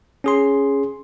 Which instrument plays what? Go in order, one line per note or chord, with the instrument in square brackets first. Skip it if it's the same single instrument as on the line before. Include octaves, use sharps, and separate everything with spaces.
[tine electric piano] C#4 G#4 C6